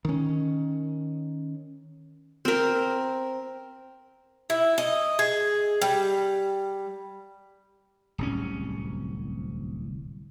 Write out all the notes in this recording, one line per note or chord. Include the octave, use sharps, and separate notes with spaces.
D#3 C#4
C4 A#4
E4
D#5
G#4
G3
D1 C2 C#4